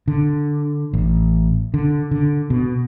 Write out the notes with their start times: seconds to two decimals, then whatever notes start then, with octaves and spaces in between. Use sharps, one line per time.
0.08 D3
0.93 A1
1.74 D3
2.11 D3
2.50 B2